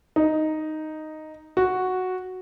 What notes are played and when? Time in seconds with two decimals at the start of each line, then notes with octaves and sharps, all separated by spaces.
0.16 D#4
1.57 F#4